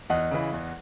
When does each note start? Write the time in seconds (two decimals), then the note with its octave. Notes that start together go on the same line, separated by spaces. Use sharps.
0.10 E2 D#5 F#5
0.31 C#3 E3
0.53 E2